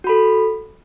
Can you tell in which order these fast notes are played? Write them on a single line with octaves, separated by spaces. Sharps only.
F#4 B5 A4